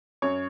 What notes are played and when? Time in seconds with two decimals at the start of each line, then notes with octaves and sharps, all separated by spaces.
0.22 F#2 C#5